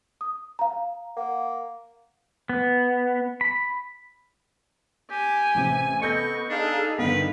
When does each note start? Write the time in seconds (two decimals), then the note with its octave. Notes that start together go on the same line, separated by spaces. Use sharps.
0.21 D#6
0.59 F5 A#5
1.17 A#3 F#5
2.49 B3
3.41 B5
5.11 G4 G#5
5.55 A1 C3
6.02 B3 A4 D#5 C#6 G6 A#6
6.49 D4 D#4 G#4 A4 F5
6.99 G2 D3 D#3 B3 A#4 B4 F5